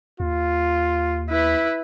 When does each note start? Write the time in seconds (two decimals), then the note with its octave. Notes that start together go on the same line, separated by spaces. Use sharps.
0.20 D#2 F4
1.29 E4 B4